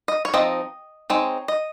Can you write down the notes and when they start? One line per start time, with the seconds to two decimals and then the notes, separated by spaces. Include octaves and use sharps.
0.08 D#5
0.25 C#5
0.34 F3 C4 D#4 D#5
1.10 G#3 C4 D#4 C#5
1.48 D#5